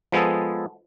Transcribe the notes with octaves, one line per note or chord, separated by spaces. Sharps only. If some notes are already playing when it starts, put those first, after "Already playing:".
F3 G#3 B3 G#4 A4